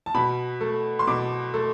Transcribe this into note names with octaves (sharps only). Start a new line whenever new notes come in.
A5
B2 B5
A3
C6
B2 D6
A3